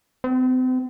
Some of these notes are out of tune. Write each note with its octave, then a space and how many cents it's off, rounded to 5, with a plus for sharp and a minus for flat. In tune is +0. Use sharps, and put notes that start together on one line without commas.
C4 -40